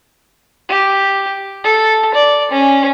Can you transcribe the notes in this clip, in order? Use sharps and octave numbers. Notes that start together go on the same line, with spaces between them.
G4
A4
D5
C#4